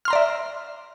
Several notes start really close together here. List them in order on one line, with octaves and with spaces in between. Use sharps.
F6 C6 A#5 D5 E5